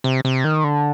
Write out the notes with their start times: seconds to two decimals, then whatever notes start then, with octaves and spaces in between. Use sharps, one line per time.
0.04 C3
0.25 C3
0.44 D#3
0.64 D3